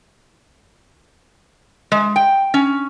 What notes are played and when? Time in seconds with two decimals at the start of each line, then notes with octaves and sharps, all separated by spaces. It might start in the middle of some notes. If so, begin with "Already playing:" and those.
1.92 G#3
2.16 G5
2.54 C#4